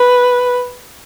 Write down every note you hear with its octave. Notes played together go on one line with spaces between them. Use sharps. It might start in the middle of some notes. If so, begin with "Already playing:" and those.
Already playing: B4